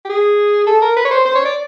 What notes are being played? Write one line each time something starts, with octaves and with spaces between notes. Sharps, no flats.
G4
G#4
A4
A#4
B4
C#5
C5
C5
C#5
D5